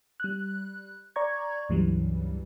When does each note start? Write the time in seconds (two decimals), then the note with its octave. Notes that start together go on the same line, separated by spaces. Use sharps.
0.20 G3 F#6
1.16 D5 A#5 C#6 G#6
1.69 C#2 G2 C#3 E3 F#3 G3